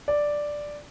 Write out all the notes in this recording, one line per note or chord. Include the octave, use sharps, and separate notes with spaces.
D5